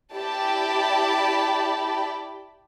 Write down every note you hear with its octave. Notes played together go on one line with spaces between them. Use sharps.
E4 G4 D5 G5 A5 B5